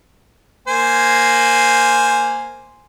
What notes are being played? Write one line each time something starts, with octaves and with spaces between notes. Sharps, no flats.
A#3 C5 G#5